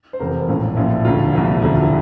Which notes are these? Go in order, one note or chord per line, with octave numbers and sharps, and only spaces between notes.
C5
F1 F2 C3 E3 A#4
A#1 A2 F3
A#1 A#2 F3 E4
E1 D2 D3 F4
C2 A#2 F3 E4
E1 D2 D3 E4
F4